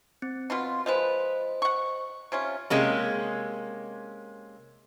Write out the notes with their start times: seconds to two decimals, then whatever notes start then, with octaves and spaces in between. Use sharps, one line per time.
0.22 C4
0.50 B2 F4 C6
0.86 F3 G#3 B4 C5 D#5
1.62 F#5 C#6
2.32 C3 C#4 F4
2.70 C3 G#3 A#3 C#4